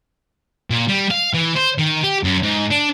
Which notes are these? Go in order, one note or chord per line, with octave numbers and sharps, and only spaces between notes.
A#2
G3
F5
E3
C5
D#3
G4
F#2
G#2
D4